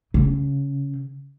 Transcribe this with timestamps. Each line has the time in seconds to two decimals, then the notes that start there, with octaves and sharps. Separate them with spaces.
0.14 C#3